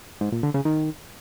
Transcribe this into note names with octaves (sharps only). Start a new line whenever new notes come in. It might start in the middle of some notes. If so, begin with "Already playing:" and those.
G#2
A#2
D3
C#3
D#3